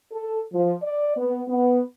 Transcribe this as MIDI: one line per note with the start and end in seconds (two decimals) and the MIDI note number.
0.12 0.39 69
0.53 0.74 53
0.82 1.14 74
1.17 1.41 59
1.48 1.81 59